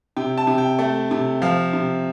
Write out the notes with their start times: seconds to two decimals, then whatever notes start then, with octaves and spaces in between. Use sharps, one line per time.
0.16 C3 G5
0.38 A5
0.47 C3
0.58 G5
0.79 A3
1.11 C3
1.42 F3 F5
1.73 C3